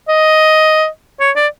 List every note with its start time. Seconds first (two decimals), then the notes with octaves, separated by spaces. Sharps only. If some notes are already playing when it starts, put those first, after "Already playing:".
0.08 D#5
1.20 C#5
1.36 D5